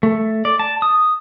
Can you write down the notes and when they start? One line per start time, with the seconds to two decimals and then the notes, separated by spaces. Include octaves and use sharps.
0.03 A3
0.45 D5
0.59 A5
0.82 D#6